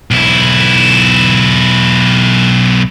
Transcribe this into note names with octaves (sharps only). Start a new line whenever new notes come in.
B1 E4